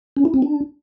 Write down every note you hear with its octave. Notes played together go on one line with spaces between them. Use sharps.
C#4
E4
C4
D4